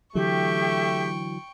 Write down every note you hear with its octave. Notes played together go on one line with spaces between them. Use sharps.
D3 E3 F#3 A3 G4 G5 C#6